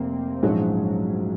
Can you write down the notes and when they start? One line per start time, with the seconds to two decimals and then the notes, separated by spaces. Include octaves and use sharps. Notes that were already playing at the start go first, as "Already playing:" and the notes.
Already playing: F1 F2 C3 A#3 C4
0.43 A#1 G#2 F3 F#3 G#3 C#4